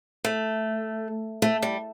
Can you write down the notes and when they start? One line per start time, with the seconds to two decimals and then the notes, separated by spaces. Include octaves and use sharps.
0.25 A3
1.42 A3
1.62 G3